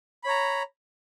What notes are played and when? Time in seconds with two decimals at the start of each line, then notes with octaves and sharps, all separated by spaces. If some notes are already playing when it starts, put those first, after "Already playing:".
0.24 B5
0.26 C#5
0.29 A#5